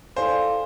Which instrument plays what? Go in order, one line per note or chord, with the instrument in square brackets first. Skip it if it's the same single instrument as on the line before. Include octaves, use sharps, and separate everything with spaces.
[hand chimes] E4 A4 D5 F5 G#5 [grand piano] C5